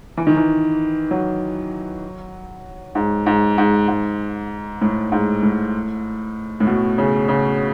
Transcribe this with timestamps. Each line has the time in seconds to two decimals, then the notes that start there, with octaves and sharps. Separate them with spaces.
0.17 E3
0.27 D#3
0.37 E3
1.11 F#3
2.95 G#2
3.26 G#2
3.58 G#2
3.88 G#2
4.82 A2
5.12 G#2
5.43 A2
6.60 A2
6.67 B2
6.98 C#3
7.28 C#3